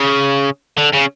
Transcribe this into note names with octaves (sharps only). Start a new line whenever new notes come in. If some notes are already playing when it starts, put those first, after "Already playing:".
Already playing: C#3
D3
C#3